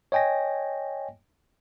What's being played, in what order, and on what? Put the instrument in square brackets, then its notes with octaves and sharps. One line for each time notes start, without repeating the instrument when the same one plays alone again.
[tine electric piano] C#5 D#5 G5 G#5 A#6